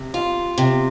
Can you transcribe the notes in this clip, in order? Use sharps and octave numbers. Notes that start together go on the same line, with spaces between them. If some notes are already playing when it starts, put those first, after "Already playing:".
Already playing: C3
F4
C3